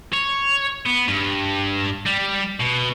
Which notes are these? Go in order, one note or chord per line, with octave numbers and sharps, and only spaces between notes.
C#5
B3
G2
G3
B2